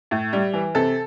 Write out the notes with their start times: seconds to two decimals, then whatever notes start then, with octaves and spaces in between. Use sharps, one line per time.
0.11 A2
0.33 G3
0.53 E3
0.75 C3 A4